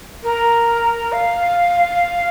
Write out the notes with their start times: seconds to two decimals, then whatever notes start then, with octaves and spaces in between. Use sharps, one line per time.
0.23 A#4
1.12 F5